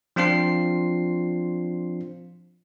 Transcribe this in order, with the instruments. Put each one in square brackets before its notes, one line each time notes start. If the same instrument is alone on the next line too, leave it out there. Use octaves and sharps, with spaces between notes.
[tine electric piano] F3 C4 D4 F4 C5 C7